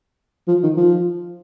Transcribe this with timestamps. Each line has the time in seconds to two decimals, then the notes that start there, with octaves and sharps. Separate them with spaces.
0.48 F3
0.63 D#3
0.77 F3